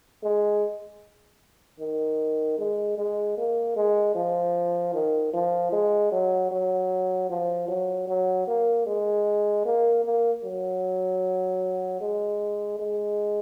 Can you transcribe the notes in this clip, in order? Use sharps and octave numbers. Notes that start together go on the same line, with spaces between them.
G#3
D#3
G#3
G#3
A#3
G#3
F3
D#3
F3
G#3
F#3
F#3
F3
F#3
F#3
A#3
G#3
A#3
A#3
F#3
G#3
G#3